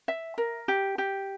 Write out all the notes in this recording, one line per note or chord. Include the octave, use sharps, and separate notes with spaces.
E5
A#4
G4
G4